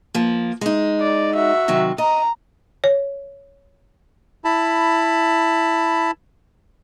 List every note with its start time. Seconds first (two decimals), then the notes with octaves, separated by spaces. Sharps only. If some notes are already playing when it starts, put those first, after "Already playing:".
0.14 F3 A#3
0.61 G#3 D#4
1.00 D5
1.34 F#4 E5
1.68 C3 D#3 F#3
1.98 D#5 A#5
2.84 C#5
4.45 E4 A5 B5